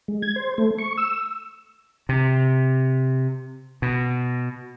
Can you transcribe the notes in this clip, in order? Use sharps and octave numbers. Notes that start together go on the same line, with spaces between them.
G#3
G#6
C5
A3
C#6
E6
C3
B2